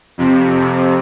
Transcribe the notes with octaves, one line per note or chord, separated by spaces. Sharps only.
F2 C3